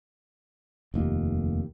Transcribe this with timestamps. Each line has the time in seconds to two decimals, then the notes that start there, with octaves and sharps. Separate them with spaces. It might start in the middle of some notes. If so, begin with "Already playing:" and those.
0.94 F1 D#2